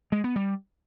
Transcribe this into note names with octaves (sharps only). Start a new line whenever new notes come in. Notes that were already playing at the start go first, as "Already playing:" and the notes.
G#3
B3
G3